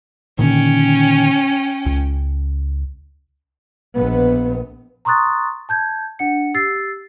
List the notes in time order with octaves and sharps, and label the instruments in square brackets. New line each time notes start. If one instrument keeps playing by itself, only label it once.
[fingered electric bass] A#2 D3 D#3 [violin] C#4 G5
[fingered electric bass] C#2
[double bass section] A#1 B3
[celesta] A#5 C6 C#6 D#6 F#6 A6
A5 G6 G#6
D4 F#5 C#7
G4 E6 A6 C7